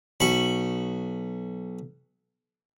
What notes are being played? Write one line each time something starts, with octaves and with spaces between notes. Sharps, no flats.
B1 B5 C#6